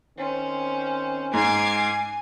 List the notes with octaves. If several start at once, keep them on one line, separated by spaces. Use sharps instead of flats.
D#3 C4 C#4 C5
G#2 G#5 D6 G#6 C7